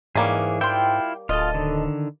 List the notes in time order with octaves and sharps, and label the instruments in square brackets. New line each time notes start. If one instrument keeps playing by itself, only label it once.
[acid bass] G#2 [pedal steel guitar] E3 G#4 [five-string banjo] G3 A#3 C#4
[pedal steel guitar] E4 F4 [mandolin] G5 C6
[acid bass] D1 [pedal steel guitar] F4 [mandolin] A4 D#5
[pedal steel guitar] D3 D#3